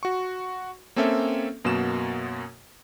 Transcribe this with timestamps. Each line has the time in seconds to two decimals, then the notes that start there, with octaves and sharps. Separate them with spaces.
0.03 F#4 C#6
0.96 A#3 C4 C#4 A4 C#5 E5
1.65 F#2 B2 A#3 F#4 E7